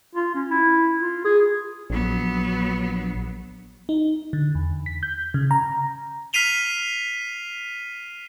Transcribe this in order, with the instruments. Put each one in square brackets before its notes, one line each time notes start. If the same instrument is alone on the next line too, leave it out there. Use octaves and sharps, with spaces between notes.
[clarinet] F4
C#4
E4
F4
G#4
[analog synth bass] A#1 [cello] F#3 B3
[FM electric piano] D#4
D3
E2
B6
G6
C#3
A#5
[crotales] F6 B6 C7 D#7 F7 G7